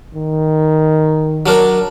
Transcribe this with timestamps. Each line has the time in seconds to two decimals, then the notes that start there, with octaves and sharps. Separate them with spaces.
0.15 D#3
1.46 F#3 D4 A#4